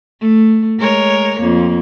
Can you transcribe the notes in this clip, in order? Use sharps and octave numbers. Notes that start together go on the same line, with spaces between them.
A3
G#3 A#4 C#5
F2 A#3